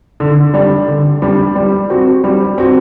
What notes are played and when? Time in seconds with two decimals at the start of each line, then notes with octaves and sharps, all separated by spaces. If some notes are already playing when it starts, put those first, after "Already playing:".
0.20 D3
0.54 G3 D4
0.88 D3
1.22 G3 D4
1.55 G3
1.90 C4 F#4
2.24 G3
2.58 C4 F#4